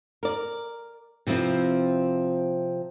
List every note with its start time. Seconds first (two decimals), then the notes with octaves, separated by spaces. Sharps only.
0.23 A#4 D5
1.27 C3 F3 C4 E4 B4